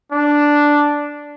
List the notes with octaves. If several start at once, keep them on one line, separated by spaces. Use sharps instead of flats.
D4